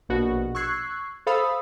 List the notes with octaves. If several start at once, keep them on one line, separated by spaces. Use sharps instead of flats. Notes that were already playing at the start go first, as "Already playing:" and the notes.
A#1 B2 F#4
C#6 E6 F#6 G#6 C7
A4 C5 F5 B5 D#6 E6